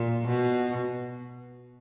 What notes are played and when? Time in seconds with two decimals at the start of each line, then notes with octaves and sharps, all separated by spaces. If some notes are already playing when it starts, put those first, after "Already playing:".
Already playing: A#2
0.27 B2